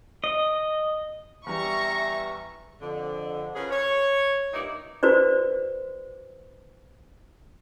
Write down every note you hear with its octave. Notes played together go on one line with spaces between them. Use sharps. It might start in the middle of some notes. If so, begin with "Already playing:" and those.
D#5
E2 G3 E5 A#5 C#6
F2 D3
C#4 F4 G#4 A#4 B4
C#5
G2 A#2 D#4 E4 D5
F#4 B4 C5 D5